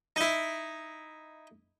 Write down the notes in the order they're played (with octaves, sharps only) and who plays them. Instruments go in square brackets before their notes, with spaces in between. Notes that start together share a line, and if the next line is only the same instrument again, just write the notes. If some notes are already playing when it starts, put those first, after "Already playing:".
[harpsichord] D#4 E4